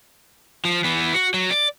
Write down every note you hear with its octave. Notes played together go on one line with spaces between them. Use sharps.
F3
E3 B3
F#4
F#3
D5